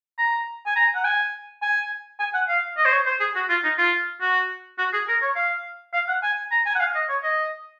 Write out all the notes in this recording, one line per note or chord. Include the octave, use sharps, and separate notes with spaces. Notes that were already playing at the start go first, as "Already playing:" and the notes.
A#5
G#5
A#5
F#5
G#5
G#5
G#5
F#5
F5
D#5
C5
C#5
C5
G#4
F#4
F4
D#4
F4
F#4
F#4
G#4
A#4
C#5
F5
F5
F#5
G#5
A#5
G#5
F#5
F5
D#5
C#5
D#5